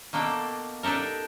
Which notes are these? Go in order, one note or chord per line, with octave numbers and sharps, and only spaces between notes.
B2 A#3 D4 A4 G5
D4 D#4 G4 A4 A#4